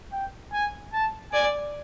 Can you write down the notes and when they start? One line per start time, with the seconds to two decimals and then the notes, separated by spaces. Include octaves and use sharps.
0.12 G5
0.53 G#5
0.93 A5
1.33 D5 G#5